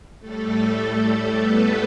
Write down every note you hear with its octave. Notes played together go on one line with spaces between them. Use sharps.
A2 G3 A3 A4
B3 B4